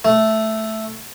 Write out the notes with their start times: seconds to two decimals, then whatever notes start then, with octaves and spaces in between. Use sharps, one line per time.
0.05 A3